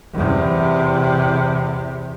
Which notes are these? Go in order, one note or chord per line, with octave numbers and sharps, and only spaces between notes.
E2 C3